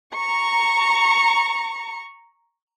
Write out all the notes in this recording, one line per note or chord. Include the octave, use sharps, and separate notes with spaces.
A#5 C#6